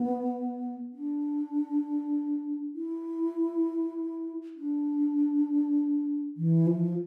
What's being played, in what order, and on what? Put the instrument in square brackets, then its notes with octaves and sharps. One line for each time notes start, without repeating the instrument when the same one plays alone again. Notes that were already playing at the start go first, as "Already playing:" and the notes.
Already playing: [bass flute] B3
D4
E4
D4
E3
F3